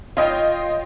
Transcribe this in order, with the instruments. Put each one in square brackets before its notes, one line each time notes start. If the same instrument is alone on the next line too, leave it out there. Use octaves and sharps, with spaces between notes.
[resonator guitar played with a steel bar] F4 [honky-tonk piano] C#5 D#5 G5